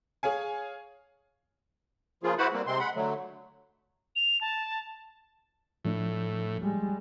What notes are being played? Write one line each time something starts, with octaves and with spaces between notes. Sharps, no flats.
G#4 C#5 F5 G#5
C#3 F3 A#3 F4 G#4
E4 F#4 B4 C5 F#5 B5
G3 A#3 C4
C3 G#3 C4 C6
G#3 F#5 B5
D3 F#3 A3
F7
A5
A2 F3 A3 D4
G3 G#3